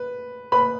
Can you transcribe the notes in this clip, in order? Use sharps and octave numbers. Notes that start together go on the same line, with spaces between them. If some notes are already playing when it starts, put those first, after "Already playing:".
Already playing: B4
B4 B5